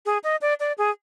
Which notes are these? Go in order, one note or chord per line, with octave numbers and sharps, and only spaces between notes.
G#4
D#5
D5
D5
G#4